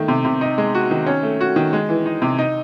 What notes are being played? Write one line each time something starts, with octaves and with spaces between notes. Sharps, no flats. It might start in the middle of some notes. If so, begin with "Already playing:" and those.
Already playing: D#3 A3
C3
C3
D#4
G#3
F#4
D#3
C#4
A3
F#4
D#3
G#3
E3
D#4
C3
D#4